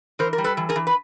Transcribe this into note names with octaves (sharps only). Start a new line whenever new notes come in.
E3 A#4 C5
A#4
G3
A4 B4
E3
G#4 A#4
E3
B4